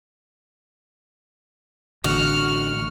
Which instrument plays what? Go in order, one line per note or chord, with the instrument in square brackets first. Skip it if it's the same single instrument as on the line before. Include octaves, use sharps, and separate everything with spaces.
[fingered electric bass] A1 D3 [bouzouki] F#4 [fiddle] F6